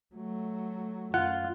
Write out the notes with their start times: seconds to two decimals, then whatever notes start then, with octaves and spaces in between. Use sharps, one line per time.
0.15 F#3 A3
1.14 F#2 F4 F#5